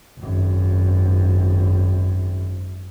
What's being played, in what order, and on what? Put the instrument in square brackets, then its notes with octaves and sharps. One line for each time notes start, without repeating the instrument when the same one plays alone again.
[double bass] G#1 F#2